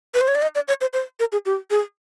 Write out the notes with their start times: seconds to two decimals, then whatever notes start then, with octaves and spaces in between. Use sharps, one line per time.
0.14 B4
0.21 C5
0.28 C#5
0.35 D5
0.42 D#5
0.55 D5
0.68 C#5
0.81 C5
0.93 C5
1.20 A#4
1.32 G#4
1.46 G4
1.71 G#4